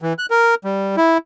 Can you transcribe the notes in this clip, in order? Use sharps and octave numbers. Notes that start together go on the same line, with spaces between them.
E3
F#6
A#4
G3
E4